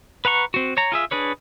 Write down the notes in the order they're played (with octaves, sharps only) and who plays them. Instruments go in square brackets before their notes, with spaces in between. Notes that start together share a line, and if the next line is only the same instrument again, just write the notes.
[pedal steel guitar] B4 F#5 A#5 C#6
C4 F#4
C#5 A#5
F4 G#4 E5
D4 G#4 B4 C#5